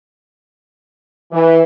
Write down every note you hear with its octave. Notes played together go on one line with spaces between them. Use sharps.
E3